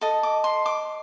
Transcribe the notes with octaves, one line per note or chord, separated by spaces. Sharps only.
A4 D#5
D6
C6
D6